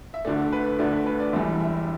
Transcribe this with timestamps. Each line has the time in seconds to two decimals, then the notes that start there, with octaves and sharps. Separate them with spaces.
0.14 E5
0.25 D2 D3 A3 D5
0.52 B4
0.79 D2 D3 A3 D5
0.92 B4
1.06 B4
1.20 D5
1.33 E1 E2 E3 G3 E5
1.61 E5